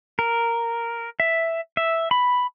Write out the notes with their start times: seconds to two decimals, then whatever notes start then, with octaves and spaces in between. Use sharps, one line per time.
0.19 A#4
1.20 E5
1.77 E5
2.11 B5